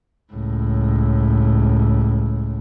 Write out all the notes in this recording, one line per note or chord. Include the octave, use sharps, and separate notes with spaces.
C#2 A2